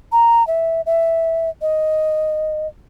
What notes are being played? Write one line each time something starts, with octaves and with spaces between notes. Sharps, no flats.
A#5
E5
E5
D#5